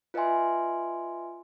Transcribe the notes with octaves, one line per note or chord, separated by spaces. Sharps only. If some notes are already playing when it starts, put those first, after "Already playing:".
F4 B4 D#5 E5 G#5 C6